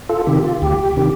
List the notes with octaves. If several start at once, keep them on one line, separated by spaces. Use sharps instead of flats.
F4 A4
C3 D#3 G4
F4
D2 G4
C3 D#3